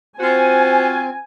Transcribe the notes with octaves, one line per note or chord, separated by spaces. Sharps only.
C4 F4 F#4 C5 G#5